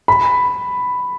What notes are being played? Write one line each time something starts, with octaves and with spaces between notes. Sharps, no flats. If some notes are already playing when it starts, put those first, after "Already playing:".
B5